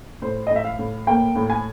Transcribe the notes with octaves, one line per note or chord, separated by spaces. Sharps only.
A2 C5
A2 D#5
E5
F5
A2
A#3 G5
A2
G#5